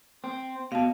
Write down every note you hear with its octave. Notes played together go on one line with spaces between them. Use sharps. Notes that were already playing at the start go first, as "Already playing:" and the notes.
C4
B2 F5 A5